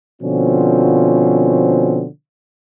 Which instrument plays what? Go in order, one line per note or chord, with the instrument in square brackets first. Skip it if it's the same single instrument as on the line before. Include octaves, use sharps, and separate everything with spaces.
[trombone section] B2 D3 F3 C4 C#4 F4